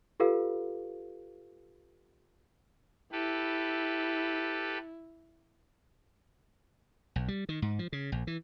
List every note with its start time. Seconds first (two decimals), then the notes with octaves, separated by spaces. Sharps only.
0.20 F4 G4 A4 B4 F5
3.12 E4 G4 A4 B4
7.16 B1
7.28 G3
7.49 D#3
7.62 G#2
7.79 F3
7.92 C#3
8.12 A#1
8.27 E3